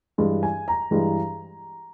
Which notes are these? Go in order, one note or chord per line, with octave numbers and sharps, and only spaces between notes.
G2 E3 G#3
G#5
A#5
G2 E3 G#3